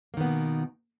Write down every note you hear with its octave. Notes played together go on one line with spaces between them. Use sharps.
B2 D#3 A#3 B3